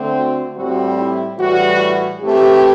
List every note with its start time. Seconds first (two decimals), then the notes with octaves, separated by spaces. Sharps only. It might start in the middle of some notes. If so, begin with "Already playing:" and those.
Already playing: D3 A3 C4
0.15 F#4
0.56 A2 G3 C4 F#4
0.97 E4
1.39 A2 E3 G3 F#4
2.22 E3 A3 C4 G4